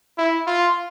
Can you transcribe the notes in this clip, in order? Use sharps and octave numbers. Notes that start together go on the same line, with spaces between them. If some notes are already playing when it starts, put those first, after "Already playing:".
E4
F4